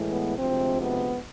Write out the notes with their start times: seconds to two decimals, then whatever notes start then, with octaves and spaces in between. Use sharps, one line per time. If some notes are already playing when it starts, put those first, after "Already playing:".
Already playing: A2 E3 G#3
0.10 B3
0.38 D2 C3 F3 G#3 C4
0.80 B3